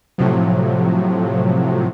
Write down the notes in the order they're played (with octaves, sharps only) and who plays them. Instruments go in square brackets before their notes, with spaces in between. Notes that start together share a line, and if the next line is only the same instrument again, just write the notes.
[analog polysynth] A2 C3 F3 F#3